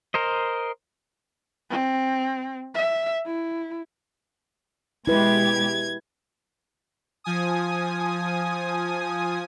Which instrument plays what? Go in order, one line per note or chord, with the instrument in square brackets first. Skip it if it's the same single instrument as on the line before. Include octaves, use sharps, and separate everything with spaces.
[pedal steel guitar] A#4 C5 D#5
[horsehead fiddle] C4
E5
E4
[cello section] B2 G#3 G4 [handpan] E4 B4 [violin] G#6
[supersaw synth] F3 G#5 D#6